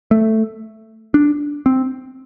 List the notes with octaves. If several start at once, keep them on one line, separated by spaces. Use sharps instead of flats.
A3
D4
C4